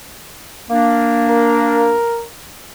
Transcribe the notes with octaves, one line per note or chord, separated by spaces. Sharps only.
A#3 D4
A#4